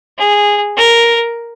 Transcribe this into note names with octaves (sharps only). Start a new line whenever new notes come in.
G#4
A#4